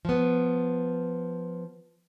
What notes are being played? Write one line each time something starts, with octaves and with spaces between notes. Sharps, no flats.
F3 B3